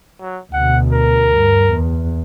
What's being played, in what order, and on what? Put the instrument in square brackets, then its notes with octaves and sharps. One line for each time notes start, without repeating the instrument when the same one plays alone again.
[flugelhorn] F#3
[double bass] D2 B2 [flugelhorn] F#5
[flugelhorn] A#4
[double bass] G2
E2